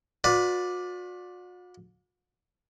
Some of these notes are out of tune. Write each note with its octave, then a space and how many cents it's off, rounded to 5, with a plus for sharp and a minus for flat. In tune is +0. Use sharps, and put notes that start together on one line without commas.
F#4 -45 B4 +0 D5 +0